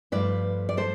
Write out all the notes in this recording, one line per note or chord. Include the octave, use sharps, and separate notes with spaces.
G2 F3 A3 B4 D5
D5
A4 C5